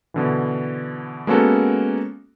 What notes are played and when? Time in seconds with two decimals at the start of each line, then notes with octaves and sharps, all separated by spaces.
0.14 B2 D3 E3
1.27 G#3 A#3 B3 C#4 F#4 A4